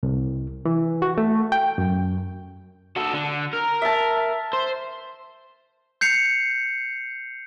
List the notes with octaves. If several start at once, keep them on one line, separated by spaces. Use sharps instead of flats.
C2
E3
F#4
A3
G5
F#2
F#4 A4
D3
A#4
E5 A5
C5
G6 C7 C#7 F7